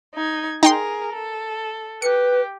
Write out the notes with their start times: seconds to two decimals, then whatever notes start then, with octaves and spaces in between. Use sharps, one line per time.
0.15 D#4 G#6
0.63 D#4 G#4 A#4 G5 C6
1.13 A4
2.02 G4 B4 C#7